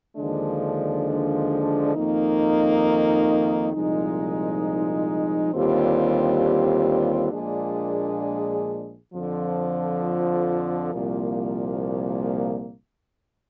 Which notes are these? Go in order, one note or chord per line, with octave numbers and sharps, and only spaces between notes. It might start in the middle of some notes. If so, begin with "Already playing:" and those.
D#2 D3 F3 G#3 D4
F2 D#3 A#3 D#4
C2 A#2 F3 G#3 D#4
D#2 D3 G3 C4 F4
A#1 A#2 G#3 D4 G#4
F2 D3 F3
C2 A#2 F3 A#3